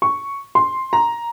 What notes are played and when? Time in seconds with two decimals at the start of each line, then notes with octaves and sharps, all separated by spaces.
0.02 C#6
0.55 C6
0.93 A#5